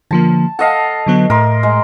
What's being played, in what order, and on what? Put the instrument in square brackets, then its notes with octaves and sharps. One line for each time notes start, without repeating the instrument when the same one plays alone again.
[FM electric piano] D3 F3 A#3 [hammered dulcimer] A5
[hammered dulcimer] A4 D#5 F5 [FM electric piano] F#5
[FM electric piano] D3 F#3 B3
[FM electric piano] A2 [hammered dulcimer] A#4 C6
[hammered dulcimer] G#3